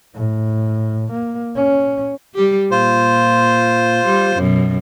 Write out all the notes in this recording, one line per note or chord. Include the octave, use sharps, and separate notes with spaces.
A2
A#3
C#4
G3 G4
A#2 F4 C5
G3
F#2 B2